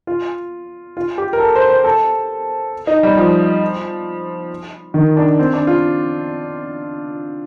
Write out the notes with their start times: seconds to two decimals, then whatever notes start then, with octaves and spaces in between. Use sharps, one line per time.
0.07 F4
0.97 F4
1.18 G4
1.33 A#4
1.40 A4
1.55 C5
1.70 C5
1.84 A4
2.87 D#4
3.03 G3
3.17 F3
4.94 D#3
5.17 D4
5.39 C4
5.53 D4
5.67 F4